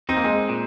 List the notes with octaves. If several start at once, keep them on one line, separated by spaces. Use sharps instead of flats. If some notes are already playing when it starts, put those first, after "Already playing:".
C4 D#4
A#3
G#3 C4
A#2